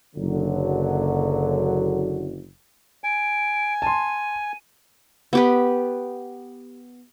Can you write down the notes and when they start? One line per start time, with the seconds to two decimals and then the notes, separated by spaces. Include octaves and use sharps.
0.16 F#1 D3 F#3
3.04 G#5 D7
3.82 A5 C6 D#7
5.33 B3 G4 B4